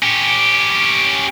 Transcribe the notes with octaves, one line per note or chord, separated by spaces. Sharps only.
C#4 G4